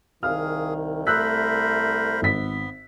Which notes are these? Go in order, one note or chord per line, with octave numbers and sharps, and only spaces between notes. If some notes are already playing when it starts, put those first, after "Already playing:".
C2 D#3 G#4 F5 F6
A3 A#4 C5 B5 E6 F#6 B6
G#1 B3 B6